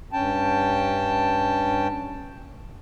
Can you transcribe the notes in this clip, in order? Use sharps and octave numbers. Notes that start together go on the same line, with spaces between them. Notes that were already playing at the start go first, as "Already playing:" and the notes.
G2 C#4 G5 A5